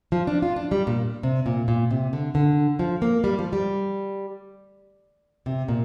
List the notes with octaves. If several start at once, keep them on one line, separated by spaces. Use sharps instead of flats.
F3
D4
F4
D4
G3
A#2
C3
A#2
A#2
C3
D3
D3
F3
A#3
G3
F3
G3
C3
A#2